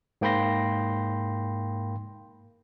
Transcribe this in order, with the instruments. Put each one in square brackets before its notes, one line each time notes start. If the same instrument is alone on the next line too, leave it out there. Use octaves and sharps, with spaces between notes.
[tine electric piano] G#2 A#3 G5 B5 C6 A#6